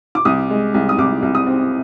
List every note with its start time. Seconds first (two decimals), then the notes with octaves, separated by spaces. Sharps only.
0.15 D6
0.25 C2 D#6
0.50 G#3
0.74 C2
0.89 D#6
0.98 C2 D6
1.22 C2
1.35 D#6
1.47 C4